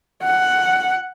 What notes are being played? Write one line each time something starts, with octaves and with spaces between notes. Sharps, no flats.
F#5